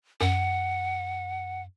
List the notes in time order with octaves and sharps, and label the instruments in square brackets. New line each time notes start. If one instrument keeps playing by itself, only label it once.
[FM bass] F#2 [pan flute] F#5